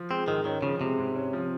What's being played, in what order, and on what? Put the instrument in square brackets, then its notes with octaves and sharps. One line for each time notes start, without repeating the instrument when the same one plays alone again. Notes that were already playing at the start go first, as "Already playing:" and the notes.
Already playing: [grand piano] F3
[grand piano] G#3 [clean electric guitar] C4
[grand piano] G#2 [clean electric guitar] D#3
[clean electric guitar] D#3 [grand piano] C#4
[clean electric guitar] C#3 [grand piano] F3
[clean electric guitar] C3 [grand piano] G#3
[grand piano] G#2
C#4
F3